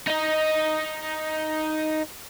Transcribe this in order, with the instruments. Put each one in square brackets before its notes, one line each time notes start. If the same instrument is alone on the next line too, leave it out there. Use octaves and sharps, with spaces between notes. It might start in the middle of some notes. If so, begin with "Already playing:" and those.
[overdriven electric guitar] D#4 D#5